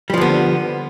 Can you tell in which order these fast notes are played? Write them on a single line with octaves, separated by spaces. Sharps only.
G3 F3 D3 B3